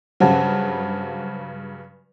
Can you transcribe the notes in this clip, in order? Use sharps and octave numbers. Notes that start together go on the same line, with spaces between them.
G2 C#3 F#3 C5 F#5 A5